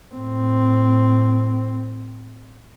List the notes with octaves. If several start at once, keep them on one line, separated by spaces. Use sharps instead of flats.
A2 C4